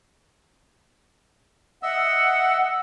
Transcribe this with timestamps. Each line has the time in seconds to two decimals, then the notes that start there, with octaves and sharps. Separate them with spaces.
1.83 D#5 E5 F#5 E6